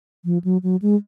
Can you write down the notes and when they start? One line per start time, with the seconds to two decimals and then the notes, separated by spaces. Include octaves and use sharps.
0.25 F3
0.44 F#3
0.63 F#3
0.82 G#3